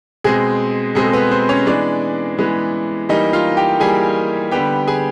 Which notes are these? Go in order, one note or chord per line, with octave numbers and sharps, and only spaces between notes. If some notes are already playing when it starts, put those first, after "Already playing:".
B2 G#3 C4 G#4
B2 G#3 C4 A4
B3 B4
C4 C5
C#4 C#5
E3 G#3 B3 D4 D5
E3 G#3 B3
E3 G3 A#3 D#4 D#5
F4 F5
G4 G5
E3 G3 A#3 G#4 G#5
D3 G3 B3 G4 G5
G#4 G#5